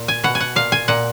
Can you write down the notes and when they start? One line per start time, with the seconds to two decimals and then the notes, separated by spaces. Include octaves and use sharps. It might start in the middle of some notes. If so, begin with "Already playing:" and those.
Already playing: A#2
0.08 G#5
0.24 B2 F#5
0.35 G#5
0.40 F#5
0.56 A#2 F5
0.72 G#5
0.88 A#2 F#5